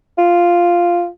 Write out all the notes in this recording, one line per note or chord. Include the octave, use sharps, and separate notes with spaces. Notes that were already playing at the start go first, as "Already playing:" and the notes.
F4